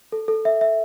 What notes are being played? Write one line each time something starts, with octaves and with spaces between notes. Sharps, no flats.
A4
A4
E5
E5